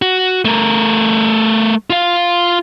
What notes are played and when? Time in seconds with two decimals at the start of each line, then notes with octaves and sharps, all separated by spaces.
0.02 F#4
0.45 A3 A#4
1.90 F4 F5